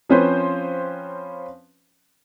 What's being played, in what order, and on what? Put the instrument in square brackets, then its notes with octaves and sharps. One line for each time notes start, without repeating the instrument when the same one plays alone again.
[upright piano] F3 C4 C#4 F4 B4 C5